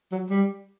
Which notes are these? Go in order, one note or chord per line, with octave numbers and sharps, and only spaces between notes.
F#3
G3